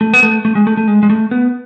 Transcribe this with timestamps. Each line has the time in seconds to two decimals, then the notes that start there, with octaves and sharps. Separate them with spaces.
0.01 A3
0.13 B3
0.23 A3
0.45 A3
0.55 G#3
0.67 A3
0.77 A3
0.88 G#3
1.03 G#3
1.10 A3
1.31 B3